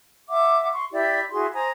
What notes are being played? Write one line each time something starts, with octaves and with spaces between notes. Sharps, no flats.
E5 F#5 D6
C6 C#6
E4 G4 D5 E5
E4 F#4 G#4 C6
C5 G#5 A#5 D#6